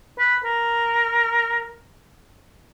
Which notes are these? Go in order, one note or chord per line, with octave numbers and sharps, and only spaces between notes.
B4
A#4